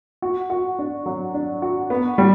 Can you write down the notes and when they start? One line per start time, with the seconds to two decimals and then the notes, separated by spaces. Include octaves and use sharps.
0.22 F#4
0.50 F#4
0.79 D4
1.06 F#3
1.34 D4
1.62 F#4
1.90 B3
2.18 G3